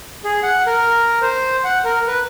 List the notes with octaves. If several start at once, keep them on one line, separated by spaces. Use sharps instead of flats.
G#4
F#5
A#4
C5
F#5
A#4
B4